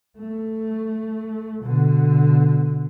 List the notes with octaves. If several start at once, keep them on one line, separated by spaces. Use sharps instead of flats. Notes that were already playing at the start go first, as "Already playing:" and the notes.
A3
B2 D3